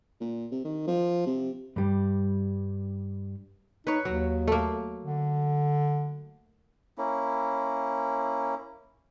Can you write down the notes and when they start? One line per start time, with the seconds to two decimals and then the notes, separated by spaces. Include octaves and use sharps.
0.20 A#2
0.51 C3
0.64 D#3
0.87 F3
1.26 C3
1.76 G2 G3
3.87 D#4 B4 C#5
4.05 D#2 F#3
4.47 A3 A#3
5.03 D3
6.98 A#3 C#4 E4